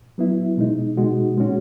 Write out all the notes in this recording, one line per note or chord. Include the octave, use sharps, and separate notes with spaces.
F#3 B3 E4
B2 G#3 D#4
B2 G#3 D#4 F#4
A#2 G#3 C#4 F#4